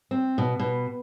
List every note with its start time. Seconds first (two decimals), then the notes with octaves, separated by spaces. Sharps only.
0.11 C4
0.38 B2
0.59 B2